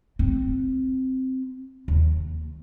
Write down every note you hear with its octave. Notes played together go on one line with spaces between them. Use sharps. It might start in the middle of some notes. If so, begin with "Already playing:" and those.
C4
D#2